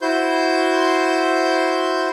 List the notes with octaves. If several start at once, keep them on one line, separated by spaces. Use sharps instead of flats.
E4 F#4 C5 C6 G6